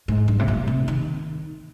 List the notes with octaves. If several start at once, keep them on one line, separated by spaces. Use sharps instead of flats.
G#2
G2
C3
A#2
C3
D#3